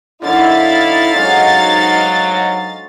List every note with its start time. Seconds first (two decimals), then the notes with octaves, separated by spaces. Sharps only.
0.22 F#2 D3 D#4 E4 F5 A6
1.14 G#2 F#3 G#3 C#4 F#4